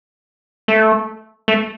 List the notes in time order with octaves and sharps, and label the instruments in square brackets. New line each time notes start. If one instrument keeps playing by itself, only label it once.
[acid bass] A3
A3